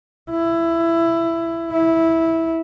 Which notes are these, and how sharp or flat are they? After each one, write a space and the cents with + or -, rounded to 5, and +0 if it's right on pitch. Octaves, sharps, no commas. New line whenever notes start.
E4 +15
E4 -10